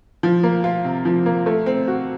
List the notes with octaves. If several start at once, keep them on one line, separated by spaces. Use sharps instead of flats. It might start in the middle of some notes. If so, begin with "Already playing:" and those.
F3
A#3
F4
C3
F3
A#3
A3
C4
F#4